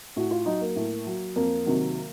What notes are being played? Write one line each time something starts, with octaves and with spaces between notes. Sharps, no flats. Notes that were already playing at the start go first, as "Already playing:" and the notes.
A2 F#4
F4
F#3 D#4
A#3
A2
F#3
F2 A#3
C3 D#3 F#3